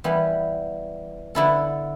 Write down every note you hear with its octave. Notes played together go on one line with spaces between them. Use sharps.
E3 G3 B3
D3 B3 E4 A4